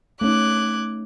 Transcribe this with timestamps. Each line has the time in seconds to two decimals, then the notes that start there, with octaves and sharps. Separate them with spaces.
0.21 A3 C#4 D#4 D6 F#6 G#6